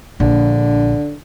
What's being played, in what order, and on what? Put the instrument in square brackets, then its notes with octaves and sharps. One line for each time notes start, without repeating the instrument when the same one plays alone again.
[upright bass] A#1 [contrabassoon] D3